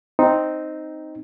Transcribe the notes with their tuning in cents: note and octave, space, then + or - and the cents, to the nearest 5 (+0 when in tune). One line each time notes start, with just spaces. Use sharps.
C4 +0 D#4 +0